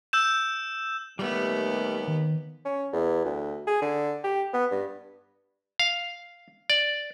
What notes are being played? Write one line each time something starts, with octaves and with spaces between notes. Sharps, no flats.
E6 G6 E7
D#2 G3 A3 B3 G4
D#3
C#4
E2
D2
G#4
D3
G4
B3
G2
F5
D5